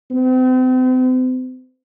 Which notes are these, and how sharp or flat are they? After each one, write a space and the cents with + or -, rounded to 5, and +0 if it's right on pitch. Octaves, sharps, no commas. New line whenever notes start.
C4 -40